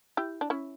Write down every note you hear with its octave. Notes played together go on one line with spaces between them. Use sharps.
E4 G4
D4
C#4 E4